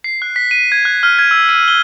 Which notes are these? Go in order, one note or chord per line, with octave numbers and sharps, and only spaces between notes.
C7
F#6
B6
D#7
G#6
F#6
F6
G#6
E6
D#7
G7